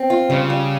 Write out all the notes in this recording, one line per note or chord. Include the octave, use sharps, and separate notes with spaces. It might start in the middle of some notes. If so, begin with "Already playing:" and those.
Already playing: C4
F4
C#3 G3
G3